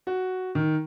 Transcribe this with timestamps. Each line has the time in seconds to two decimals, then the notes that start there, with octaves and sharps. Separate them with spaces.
0.07 F#4
0.55 D#3